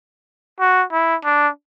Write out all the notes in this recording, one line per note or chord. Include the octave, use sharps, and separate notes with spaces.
F#4
E4
D4